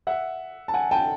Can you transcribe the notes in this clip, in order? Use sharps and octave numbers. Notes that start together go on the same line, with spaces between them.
E5 F#5
A5
F#5 G#5
G5 A5